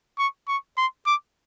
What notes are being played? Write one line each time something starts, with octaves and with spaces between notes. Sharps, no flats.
C#6
C#6
C6
D6